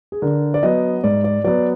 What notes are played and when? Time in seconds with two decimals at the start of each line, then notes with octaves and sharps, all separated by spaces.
0.12 G#4
0.22 D3 A#4
0.54 D5
0.63 F#3 B3 D#5
1.04 G#2 D5
1.24 D5
1.44 F#3 B3 D5